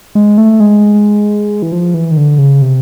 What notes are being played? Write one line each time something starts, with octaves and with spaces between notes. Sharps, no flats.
G#3
A3
G#3
E3
F3
E3
D#3
D3
C#3
C3